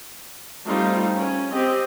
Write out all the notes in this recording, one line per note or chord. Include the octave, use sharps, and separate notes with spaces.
G3 A3 C4 D#4 F4
C#4
C4 G4 D#5